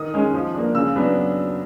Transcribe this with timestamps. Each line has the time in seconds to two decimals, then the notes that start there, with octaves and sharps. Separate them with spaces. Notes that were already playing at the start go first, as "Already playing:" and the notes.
Already playing: D#3 D#6
0.14 G#3 C#4
0.34 F3
0.54 A#3 D4
0.74 C#3 E6
0.95 F#3 B3 D4